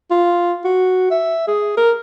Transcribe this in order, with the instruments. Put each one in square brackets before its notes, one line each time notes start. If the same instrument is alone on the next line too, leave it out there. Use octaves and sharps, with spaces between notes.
[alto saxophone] F4
F#4
E5
G#4
A#4